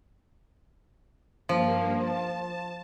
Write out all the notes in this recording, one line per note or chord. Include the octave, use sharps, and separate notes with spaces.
G2 F3 A#3
A5